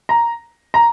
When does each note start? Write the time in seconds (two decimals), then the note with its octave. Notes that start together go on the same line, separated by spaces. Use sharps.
0.09 A#5
0.74 A#5